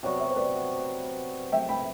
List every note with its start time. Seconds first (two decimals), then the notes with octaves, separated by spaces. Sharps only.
0.03 C3 F#3 B3 F#4 D5 F#5
0.20 C5 E5
0.31 C5
0.36 B4 D5
1.52 E5 G5
1.69 G5 B5